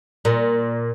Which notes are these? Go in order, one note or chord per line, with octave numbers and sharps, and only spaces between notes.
A#2